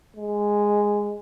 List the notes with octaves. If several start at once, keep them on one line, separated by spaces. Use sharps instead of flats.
G#3